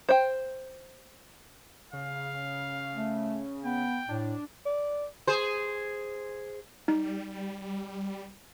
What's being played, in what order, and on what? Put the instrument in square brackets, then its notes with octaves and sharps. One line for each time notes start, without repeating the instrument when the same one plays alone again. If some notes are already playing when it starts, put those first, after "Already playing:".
[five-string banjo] C5 G5
[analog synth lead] C#3 [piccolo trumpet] F5
[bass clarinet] A3
[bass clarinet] B3 [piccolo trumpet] G5
[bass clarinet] A2 [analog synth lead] D4
[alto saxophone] D5
[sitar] G#4 C5
[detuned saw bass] G3 [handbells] D#4